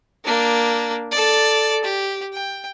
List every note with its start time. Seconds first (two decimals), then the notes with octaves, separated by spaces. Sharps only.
0.24 A#3 D4
1.11 A4 D5
1.84 G4
2.33 G5